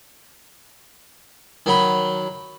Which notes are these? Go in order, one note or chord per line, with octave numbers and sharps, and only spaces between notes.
D#3 F#3 B5